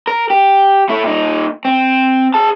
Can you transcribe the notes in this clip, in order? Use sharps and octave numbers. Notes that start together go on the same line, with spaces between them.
A#4
G4
A3 E4
A#2 D#4
C4
G#4 A5